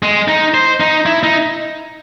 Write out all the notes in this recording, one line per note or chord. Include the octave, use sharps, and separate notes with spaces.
G#3
D#4
C5
D#4
E4
D#4